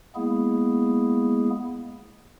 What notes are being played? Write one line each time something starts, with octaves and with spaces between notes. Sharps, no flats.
G#3 A#3 B3 E4 G#4